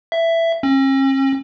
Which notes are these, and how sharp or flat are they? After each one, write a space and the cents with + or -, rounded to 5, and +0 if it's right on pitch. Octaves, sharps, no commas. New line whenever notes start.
E5 +10
C#4 -45